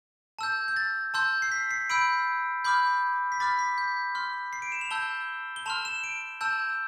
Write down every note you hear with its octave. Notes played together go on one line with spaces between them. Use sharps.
A5 E6 G6
G6
A6
A5 C6 E6 G6
C7
B6
C7
B5 E6 G6 D7
B5 D6 F6 G6
B6
B5 D6 F6 A6
B6
G6
C6 F6
C7
D7
E7
F7
A5 E6 G6 G7
G7
A5 C6 F6 F7
E7
D7
A5 E6 G6